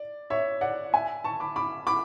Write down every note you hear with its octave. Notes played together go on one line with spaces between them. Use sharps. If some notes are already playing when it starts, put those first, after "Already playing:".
Already playing: D5
C#5 E5
D5 F#5
E5 G#5
A5 C#6
B5 D6
B5 D6
B5 D6